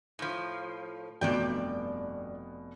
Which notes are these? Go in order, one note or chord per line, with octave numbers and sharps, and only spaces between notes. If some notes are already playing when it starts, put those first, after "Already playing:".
A2 F3
F1 G2 B2 D5 G5